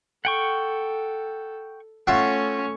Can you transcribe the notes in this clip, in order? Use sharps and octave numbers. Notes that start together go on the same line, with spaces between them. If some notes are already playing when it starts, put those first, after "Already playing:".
A4 F#5 G5 C#6
A3 C#4 F4 E5 F#5 C#6